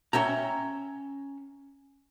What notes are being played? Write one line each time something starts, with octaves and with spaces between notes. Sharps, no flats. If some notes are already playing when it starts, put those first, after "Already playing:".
C#4 E5 G5 A#5